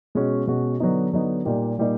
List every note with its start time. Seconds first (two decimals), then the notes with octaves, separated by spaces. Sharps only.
0.15 B2 G#3 C#4 F#4
0.47 B2 G#3 C#4 F#4
0.80 D3 F#3 B3 D#4
1.13 D3 F#3 B3 D#4
1.45 A#2 G3 A#3 D#4 G4
1.79 A#2 G3 A#3 D#4 G4